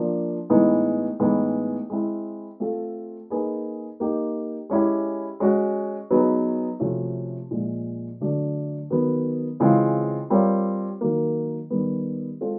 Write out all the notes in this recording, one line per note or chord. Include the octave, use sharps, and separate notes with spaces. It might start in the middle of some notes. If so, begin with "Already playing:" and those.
Already playing: F3 A#3 D4
A2 E3 G#3 B3 D#4
A2 E3 G#3 B3 D#4
G#3 C4 E4
A3 C4 F4 A4
A#3 D#4 G#4 B4
A#3 D#4 G4
G#3 C#4 E4 G4
G#3 C#4 F#4
F#3 B3 D#4 G#4 B4
C3 F3 A3 C#4 F#4
A#2 F3 G#3
D3 F#3 A3 D4
D#3 F#3 B3
C#3 E3 G#3 C4 F4
G3 C4 F4 A#4 C#5
D#3 F#3 A#3
D#3 G3 B3
G#3 C4 F4 A4 C5